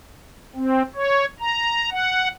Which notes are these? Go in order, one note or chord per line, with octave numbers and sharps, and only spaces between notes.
C4
C#5
A#5
F#5